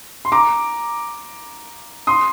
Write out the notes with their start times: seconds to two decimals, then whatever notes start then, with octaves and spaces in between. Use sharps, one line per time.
0.25 C6
0.32 A#5 D6
2.07 C6 D#6